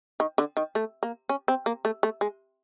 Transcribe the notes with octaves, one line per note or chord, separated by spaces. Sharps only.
D#3
D3
D#3
A3
A#3
C#4
C4
A#3
A3
A3
G#3